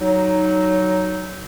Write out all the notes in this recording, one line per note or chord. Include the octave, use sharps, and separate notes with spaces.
F#3 D#4